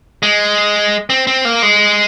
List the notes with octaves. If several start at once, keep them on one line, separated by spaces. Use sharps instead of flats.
G#3
C4
C4
A#3
G#3